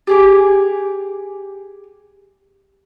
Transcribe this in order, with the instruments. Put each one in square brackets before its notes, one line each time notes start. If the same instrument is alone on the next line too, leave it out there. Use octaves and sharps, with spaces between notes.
[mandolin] G4 G#4 D6